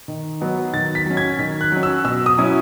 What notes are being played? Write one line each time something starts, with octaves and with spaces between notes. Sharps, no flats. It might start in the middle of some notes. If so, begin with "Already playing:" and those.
D#3
F#3 B3 D#4
D#3 A6
B6
F#3 C#4
G#6
D#3 B6
F#6
F#3 C#4
E6
B2 E6
D#6
F#3 C#4 E4